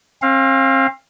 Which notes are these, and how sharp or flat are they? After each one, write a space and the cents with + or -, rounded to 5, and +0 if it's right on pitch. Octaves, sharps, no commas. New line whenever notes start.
C4 +40 F5 +0